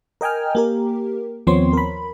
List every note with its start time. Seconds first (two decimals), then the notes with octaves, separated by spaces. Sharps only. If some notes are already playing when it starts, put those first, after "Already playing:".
0.21 A#4 D#5 G5 G#5 F6
0.55 A#3 G4 A#4
1.47 D#2 F3 B3 C4 C#5 C6
1.73 A#4 B5